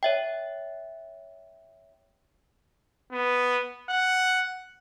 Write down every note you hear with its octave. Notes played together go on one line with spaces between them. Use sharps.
C#5 E5 G5
B3
F#5